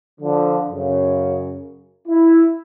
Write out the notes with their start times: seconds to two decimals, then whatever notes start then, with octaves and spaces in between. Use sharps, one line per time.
0.21 D3 F3
0.69 F#2 C#3
2.08 E4